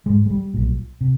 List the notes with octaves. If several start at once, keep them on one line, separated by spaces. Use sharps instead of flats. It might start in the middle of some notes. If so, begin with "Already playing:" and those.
A1 G#3
G#2
G#3
G3
B1 A#2
C3